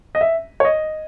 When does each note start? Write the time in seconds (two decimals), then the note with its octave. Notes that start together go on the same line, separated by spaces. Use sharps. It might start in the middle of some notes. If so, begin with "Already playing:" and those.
0.15 D#5
0.21 E5
0.60 C#5
0.65 D#5